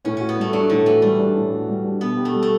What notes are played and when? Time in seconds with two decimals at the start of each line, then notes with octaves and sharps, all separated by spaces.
0.05 A2 C#4
0.17 C#4 F#4
0.29 B3
0.37 G3 A3
0.53 F#3 D4
0.70 A2 D3
0.86 E3 F#4
1.02 G3 A3
1.19 D4
1.36 A2
1.52 F#4
1.68 G3
1.84 D4
2.01 B2 B3
2.17 G4
2.25 A3
2.34 G3
2.43 A3